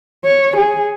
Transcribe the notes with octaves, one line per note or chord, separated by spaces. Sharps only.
C#5
G#4